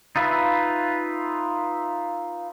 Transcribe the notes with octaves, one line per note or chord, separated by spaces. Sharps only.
D#4 F4 B4 E5